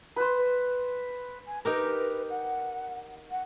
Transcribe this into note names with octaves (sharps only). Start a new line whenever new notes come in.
B4 C5
G#5
D#4 G4 A#4 B4
F#5
F#5